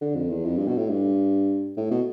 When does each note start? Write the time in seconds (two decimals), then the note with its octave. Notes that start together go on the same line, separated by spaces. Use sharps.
0.01 D3
0.15 F2
0.30 E2
0.45 F2
0.57 G2
0.68 B2
0.78 A2
0.89 G2
1.77 A2
1.91 B2